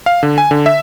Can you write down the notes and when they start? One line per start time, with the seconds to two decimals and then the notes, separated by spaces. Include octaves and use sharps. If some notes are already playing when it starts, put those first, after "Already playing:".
0.06 F5
0.23 D3
0.38 G#5
0.51 D3
0.66 E5